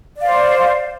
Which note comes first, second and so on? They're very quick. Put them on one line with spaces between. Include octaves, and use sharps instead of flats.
D5 F5 C5